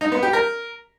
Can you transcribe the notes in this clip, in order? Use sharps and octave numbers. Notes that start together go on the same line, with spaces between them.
D#4
B3
G4
A#4